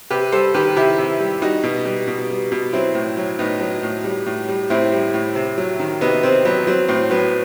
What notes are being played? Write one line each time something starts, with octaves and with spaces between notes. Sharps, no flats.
C3 G4 B4
G3 A4 C5
D#3 G4 B4
C3 E4 G4
C3
G3
G3 D#4 F#4
B2
G3
B2
G3
B2
F#3 C4 E4
A2
F#3
A2 B3 D#4
F#3
A2
G3
A2
G3
A2 C4 E4
G3
A2
C3
F#3
D#3
C3 B3 D#4
C3 C4
F#3 B3
F#3 C4
A2 C4
F#3 B3